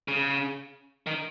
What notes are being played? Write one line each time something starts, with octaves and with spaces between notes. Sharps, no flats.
C#3
D#3